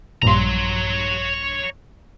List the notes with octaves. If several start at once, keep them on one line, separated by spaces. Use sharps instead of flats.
A#1 G2 C#5 A#5 C6